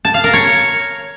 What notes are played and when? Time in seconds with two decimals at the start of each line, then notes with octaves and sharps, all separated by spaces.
0.05 A5
0.14 F5
0.24 A#4
0.33 C#5